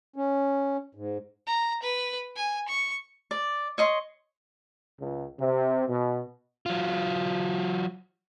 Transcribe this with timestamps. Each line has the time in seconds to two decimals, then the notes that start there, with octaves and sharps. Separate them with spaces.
0.16 C#4
0.95 G#2
1.47 A#5
1.82 B4
2.36 G#5
2.68 C#6
3.31 D5
3.78 C#5 D#5 C6
4.99 C#2
5.40 C3
5.87 B2
6.66 F#3 F4